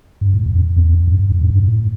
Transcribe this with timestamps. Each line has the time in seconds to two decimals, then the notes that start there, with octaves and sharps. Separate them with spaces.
0.21 G2
0.34 A2
0.46 F2
0.58 F2
0.77 E2
0.94 F2
1.07 G2
1.19 G2
1.32 F2
1.41 A2
1.50 G2
1.68 A2